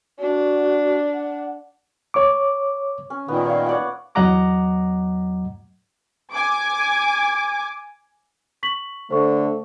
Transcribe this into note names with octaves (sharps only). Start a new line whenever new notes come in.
D4 F#4
F#5
C#5 D6
C#4
A#2 D#3 B3
C#5 F5
C#5 D5 F#5
E2 F#3 D#5 F#5 A#5 D6
G#5 D6
C#6 B6 F#7
D3 A3 C5 C#6